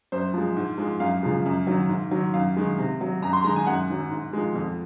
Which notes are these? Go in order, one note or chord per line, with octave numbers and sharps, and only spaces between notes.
F#2 C5
F3 G#3
G#2
F3 G#3
F#2 F5
C#3 F3 G#3
F#2
D#3 F#3
G#2
D#3 F#3
F#2 F5
D#3 G#3
C3
F#3
F#2 A#5
C6
D#3 G#3 A#5
G#5
F#2 F#5
D#3 F#3
G#2
F3 G#3
F2